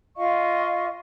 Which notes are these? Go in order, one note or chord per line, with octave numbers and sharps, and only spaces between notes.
F4 D#5 F5 C#6